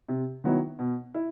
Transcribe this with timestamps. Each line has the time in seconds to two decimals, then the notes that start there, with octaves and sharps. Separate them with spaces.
0.09 C3
0.44 D#3 F#3 B3 E4
0.79 B2
1.14 E4